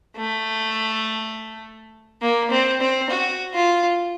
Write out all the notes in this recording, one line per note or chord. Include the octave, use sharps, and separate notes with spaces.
A3
A#3
C4
C4
F#4
F4